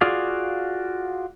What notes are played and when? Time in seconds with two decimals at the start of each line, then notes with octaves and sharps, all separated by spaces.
0.01 F4 F#4 G#4 D5 F5